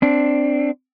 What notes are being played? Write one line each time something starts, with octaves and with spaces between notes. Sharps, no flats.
C4 D4